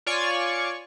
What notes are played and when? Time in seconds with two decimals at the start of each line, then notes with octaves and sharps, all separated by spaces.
0.06 F4 C#5 D5 G#5 C#6